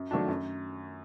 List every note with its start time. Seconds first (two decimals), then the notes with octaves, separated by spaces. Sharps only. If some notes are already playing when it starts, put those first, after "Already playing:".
Already playing: F#2
0.11 D#3 F#3 A3 D4
0.28 F#2